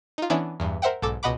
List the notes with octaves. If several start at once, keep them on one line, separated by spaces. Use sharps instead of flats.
D#4 F4
E3 B3 C#4 D4 E4
E2 G2
A#4 C5 E5 F#5 G5
B1 G#2 A4 D6 E6
C#2 B2 D#5 F#5 B5 D6